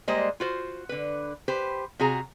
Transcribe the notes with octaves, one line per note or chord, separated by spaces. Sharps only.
G3 G#3 A#3 C5 D#5
F4 F#4 C5
D3 B4
G4 B4 C5
C3 F#4 G#4 A#5